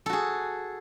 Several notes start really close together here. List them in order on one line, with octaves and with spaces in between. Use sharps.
A4 F#4 G#4